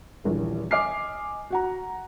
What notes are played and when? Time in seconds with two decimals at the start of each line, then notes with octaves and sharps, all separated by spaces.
0.24 D#1 A#1 E3
0.71 D#5 G#5 D6 F6 C7
1.50 F#4 F#5 A#5